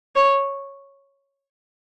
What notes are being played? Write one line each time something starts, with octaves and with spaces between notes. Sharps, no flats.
C#5